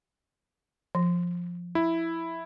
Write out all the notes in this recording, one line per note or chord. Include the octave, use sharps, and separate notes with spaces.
F3
E4